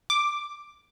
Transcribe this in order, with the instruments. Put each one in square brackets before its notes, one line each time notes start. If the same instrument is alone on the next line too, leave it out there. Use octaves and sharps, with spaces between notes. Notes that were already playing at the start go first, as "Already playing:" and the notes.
[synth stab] D6